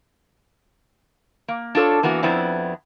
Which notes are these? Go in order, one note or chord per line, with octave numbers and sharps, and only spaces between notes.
A#3
D4 F4 A4 C#5
E3 A#3 B3 F#4
F2 B3 C4 D4 E4